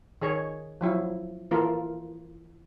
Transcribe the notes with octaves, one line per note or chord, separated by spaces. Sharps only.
D#3 G#4 C#5
F3 F#3 E4
E3 A#3 F4 A4 A#4